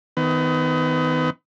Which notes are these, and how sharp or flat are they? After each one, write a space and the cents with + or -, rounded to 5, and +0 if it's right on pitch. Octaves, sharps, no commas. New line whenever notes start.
D#3 +25 B3 +35